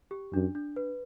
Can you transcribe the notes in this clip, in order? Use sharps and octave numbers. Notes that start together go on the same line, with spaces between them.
G4
F#2 D4
D4
B4